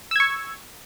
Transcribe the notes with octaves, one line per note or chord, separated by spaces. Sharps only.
C#6 E6 G#6